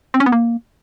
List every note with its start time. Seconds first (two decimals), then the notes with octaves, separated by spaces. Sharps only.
0.14 C4
0.20 C#4
0.26 B3
0.32 A#3